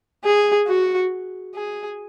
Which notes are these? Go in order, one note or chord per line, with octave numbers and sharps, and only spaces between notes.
G#4
F#4
G#4